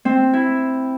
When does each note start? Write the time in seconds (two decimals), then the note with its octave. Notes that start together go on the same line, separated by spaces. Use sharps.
0.05 C4
0.33 E4